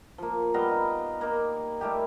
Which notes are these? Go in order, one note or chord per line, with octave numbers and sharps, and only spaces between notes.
F3 A#3
G3 B3 D#5 F5
D#4
A#3 D#4
G3 A3 A#3 G4